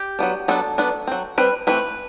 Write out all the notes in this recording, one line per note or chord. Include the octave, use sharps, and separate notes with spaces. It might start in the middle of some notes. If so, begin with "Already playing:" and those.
Already playing: G4
F#3 B3 D4
F#3 B3 D4 A4
F#3 B3 D4
F#3 C4
G3 C4 B4
E3 A3 C4 B4